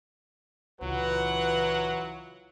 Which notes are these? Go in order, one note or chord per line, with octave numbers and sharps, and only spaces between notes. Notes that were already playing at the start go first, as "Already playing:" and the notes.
C#2 A#2 E3 F#3 F4 B4 F#5